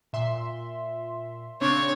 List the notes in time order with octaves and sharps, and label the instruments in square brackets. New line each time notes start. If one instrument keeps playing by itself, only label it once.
[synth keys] A#2 E5 C6
[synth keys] C#3 C4 D4 [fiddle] C#5